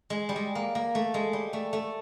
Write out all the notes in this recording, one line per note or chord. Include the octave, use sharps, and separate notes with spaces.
G#3
G3
G#3
A#3
A#3
A3
G#3
G3
A3
A3